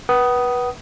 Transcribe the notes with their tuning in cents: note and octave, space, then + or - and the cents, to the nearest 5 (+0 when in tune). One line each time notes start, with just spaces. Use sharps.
B4 -20 F#5 +35 D#6 +0